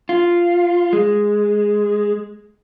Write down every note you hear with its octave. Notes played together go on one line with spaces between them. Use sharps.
F4
G#3